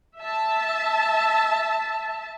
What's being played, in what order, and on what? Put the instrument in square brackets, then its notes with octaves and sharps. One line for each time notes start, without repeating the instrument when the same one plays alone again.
[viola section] E5 A5